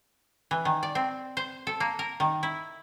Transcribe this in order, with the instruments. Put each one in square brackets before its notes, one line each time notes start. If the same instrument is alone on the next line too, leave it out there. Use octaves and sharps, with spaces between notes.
[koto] E3
D#3
D5
C4
C5
A4
A#3
A#4
D#3
E4